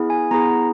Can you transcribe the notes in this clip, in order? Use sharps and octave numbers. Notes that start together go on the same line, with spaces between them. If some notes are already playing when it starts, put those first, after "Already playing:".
Already playing: B3 E4 G#4
G#5
B3 E4 G#4 A#5